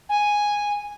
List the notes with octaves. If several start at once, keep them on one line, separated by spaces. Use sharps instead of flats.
G#5